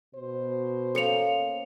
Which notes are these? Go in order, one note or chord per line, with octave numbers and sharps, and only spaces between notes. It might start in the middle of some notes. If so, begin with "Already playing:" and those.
B2 C5
A#3 C#4 A4 C#7 F7